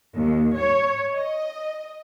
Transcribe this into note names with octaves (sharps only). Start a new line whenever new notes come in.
D#2
C#5
D#5